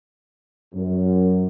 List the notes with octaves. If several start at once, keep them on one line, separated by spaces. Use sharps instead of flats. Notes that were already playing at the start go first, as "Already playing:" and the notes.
F#2